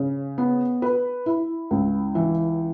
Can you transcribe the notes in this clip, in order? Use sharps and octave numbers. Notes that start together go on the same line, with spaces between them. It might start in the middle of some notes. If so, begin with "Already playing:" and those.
Already playing: C#3
B3
B4
E4
C#2
E3